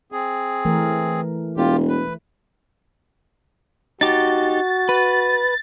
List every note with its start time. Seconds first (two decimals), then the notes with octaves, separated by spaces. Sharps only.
0.12 C4 G#4
0.65 E3 A3 A#4
1.57 E1 F4 G4
1.89 B4
4.01 D#4 F#4 G4 A6
4.89 B4